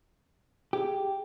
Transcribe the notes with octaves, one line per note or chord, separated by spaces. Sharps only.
G4 G#4 G5